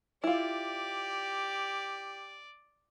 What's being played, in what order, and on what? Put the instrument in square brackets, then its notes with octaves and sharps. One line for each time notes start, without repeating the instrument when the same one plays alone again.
[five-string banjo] E4 F4 [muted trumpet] G4 [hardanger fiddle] D5